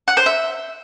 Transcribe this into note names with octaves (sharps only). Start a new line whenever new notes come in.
F#5
C5
E5